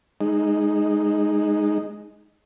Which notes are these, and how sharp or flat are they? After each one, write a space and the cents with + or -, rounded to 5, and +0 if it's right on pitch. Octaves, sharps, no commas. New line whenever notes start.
G#3 +0 D#4 -10